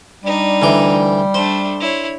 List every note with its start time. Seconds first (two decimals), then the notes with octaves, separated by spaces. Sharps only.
0.24 G3 D4 D#4
0.62 D2 E3 D6
1.34 A3 D4 C5
1.80 E4 C#5